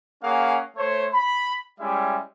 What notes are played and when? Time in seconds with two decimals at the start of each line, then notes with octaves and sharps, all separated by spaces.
0.23 A#3 C#4 G#4 F5 F#5
0.77 A3 C5 C#5
1.13 B5
1.80 G3 G#3 C#4 E4 E5